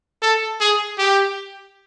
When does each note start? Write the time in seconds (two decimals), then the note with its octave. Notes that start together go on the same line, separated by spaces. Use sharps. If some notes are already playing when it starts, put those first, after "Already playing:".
0.22 A4
0.60 G#4
0.98 G4